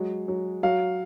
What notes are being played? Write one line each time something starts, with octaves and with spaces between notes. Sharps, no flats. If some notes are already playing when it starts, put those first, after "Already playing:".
Already playing: F#3 G#3
F#3
F#3 F5